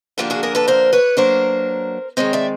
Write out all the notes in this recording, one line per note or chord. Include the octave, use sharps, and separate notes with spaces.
D3 F3 A#3 D4 F4 G4
F#4 G#4
G#4 A#4
A4 B4
A#4 C5
B4 C#5
F#3 A#3 D4 A#4 C5
D#3 G#3 C4 C#5 D#5
D5 E5